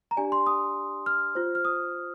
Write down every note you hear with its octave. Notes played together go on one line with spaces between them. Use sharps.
A#5
D4 G4 D5 G#5
C6
D#6
F6
F4 C5
F6
D#6